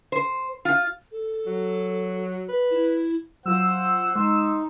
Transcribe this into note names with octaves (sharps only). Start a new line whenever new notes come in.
C5
F4
A4
F#3
B4
E4
F#3 F4 C5 F#5 E6
G#3 D#4 C6